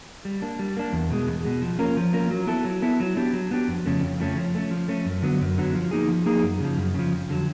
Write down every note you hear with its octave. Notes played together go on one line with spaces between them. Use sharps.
G3
A#3 D4
G3
A#3 D4
E2
B2 G#3
E2
B2 G#3
F3
A#3 C#4 F4 A#4
F3
A#3 C#4 F4 A#4
F#3
B3 E4 A4
F#3
B3 E4 A4
F#3
B3 D4 G4
F#3
B3 D4 G4
F2
C#3 F3 A3 C#4
F2
C#3 F3 A3 C#4
F3
A3 C#4
F3
A3 C#4
F#2
D3 F#3 B3
F#2
D3 F#3 B3
F3
A#3 D#4 G#4
F3
A#3 D#4 G#4
F#2
C#3 F3
F#2
C#3 F3
F2
D3 F#3